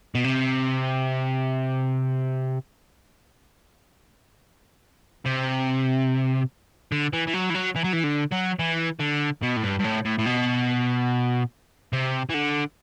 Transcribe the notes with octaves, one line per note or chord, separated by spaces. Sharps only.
B2
C3
C3
D3
E3
E3
F#3
E3
F#3
E3
F#3
E3
D3
F#3
E3
D3
B2
A2
G2
G2
A2
A2
A2
B2
C3
E3
D3